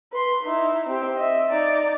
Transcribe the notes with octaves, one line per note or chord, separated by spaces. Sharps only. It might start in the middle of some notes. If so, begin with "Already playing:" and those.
B4 C6
D#4 E4
C4 G4
D#5 E5
D#4 D5